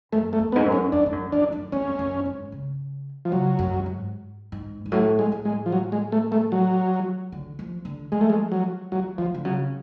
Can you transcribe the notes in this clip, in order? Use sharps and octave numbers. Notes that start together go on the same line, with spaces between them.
F#2 A3
A3
F2
B3
G#2
F#2
C#4
F2 D4
G#2
F#2
F2 D4
F#2
F2 C#4
F2
F#2
G#2
C#3
F3
C#3 F#3
F#2
G#2
G#2
G#2
A2 F#3
G#3
A2
G#3
F3
F#3
G#3
A3
A3
F#3
D3
F3
D3
F3 G#3
A3
G#3
F#3
F3 F#3
D3 F3
D3
C#3 F#3